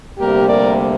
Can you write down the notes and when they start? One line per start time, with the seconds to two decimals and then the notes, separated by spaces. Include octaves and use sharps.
0.19 D2 C3 G3 A#3 G4 A#4
0.48 A#4 D5